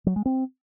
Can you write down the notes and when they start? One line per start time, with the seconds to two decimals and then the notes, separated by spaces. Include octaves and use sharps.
0.06 F#3
0.16 G#3
0.26 C4